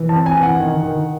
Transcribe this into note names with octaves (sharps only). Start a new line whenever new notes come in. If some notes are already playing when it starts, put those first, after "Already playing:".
Already playing: E3
A5
C4
G#5
E3
F#5
D#3
D#3